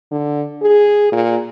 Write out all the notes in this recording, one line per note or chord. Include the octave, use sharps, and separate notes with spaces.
D3
G#4
A#2